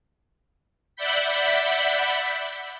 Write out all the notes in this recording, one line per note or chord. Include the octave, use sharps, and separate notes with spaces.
D5 E5 F#5 B5 G6 B6